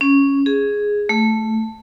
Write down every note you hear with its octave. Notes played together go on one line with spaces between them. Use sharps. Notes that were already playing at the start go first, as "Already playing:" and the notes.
C#4
G#4
A3